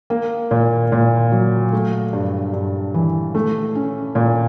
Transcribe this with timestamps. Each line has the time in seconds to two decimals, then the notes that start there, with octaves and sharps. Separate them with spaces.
0.10 A#3
0.51 A#2
0.92 A#2
1.32 F#3
1.72 A3
2.13 G2
2.53 G2
2.94 E3
3.35 A3
3.75 C#4
4.15 A#2